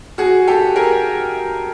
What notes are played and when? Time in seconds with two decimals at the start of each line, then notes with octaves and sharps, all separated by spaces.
0.18 F#4 G#4
0.47 G4 A4
0.76 G#4 A#4